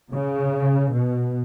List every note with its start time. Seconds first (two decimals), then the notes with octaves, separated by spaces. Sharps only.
0.10 C#3
0.90 B2